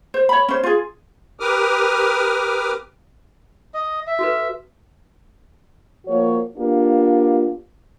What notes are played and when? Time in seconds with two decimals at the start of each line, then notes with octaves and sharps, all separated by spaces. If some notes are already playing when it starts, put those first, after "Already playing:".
0.14 C5
0.29 C#5 B5
0.49 C#4 C5
0.63 F4 G#4
1.40 G4 A#4 B4 D6 D#6 F6
3.74 D#5
4.07 E5
4.19 F#4 A4 B4
6.06 F3 A#3 F#4 C#5
6.56 A#3 B3 D4 F4 G4